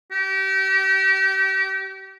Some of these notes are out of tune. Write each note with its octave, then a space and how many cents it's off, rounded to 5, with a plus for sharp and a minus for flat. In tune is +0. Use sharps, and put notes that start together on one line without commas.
G4 -35